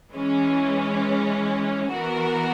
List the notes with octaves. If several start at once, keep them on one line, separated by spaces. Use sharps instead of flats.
E3 G#3 C#4
E3 B3 F#4 A#4